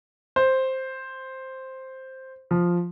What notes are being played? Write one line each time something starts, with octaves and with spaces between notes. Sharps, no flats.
C5
F3